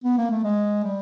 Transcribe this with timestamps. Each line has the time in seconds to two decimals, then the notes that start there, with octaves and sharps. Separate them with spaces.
0.04 B3
0.18 A#3
0.31 A3
0.44 G#3
0.84 G3